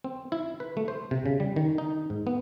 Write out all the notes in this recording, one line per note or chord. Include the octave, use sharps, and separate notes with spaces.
C4
E4
B4
A3
C5
C3
C#3
G3
D#3
D#4
G#2
B3